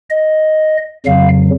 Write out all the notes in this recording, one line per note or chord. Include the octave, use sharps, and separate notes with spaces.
D#5
F2 C#3 F#3 F5